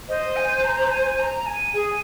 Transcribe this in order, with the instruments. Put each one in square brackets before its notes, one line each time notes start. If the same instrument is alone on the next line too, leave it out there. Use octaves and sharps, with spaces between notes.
[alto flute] C5 [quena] D#5
[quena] G#5
A#5
G#5
A#5
G#5
[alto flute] G#4 [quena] G#5